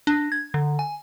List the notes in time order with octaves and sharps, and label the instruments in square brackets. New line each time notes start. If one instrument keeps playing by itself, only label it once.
[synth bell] D4
G#6
D3
G#5